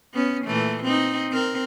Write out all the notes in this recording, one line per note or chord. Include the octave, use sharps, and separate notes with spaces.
B3 C#4
A#2 E3 A3
C4 D#4
C4 A#4